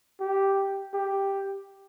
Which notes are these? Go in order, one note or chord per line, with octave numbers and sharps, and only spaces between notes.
G4
G4